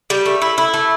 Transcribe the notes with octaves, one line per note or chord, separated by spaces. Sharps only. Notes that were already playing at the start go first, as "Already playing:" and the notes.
G3
A3
E4
E4
A3